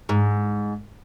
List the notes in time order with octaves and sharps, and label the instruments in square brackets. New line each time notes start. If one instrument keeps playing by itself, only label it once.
[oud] G#2